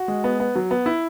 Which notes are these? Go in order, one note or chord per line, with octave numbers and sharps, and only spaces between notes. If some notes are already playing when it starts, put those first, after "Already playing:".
Already playing: F#4
G#3
B3
B3
F#3
B3
E4